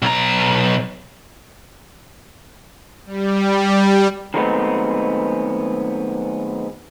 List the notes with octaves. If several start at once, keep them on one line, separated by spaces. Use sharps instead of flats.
B1 A#5
G3
D#3 F#3 G#3 A3 B3 C4